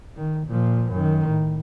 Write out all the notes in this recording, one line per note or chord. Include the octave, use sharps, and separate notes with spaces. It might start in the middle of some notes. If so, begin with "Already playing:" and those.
D#3
A#2 F3
F#2 D#3
A2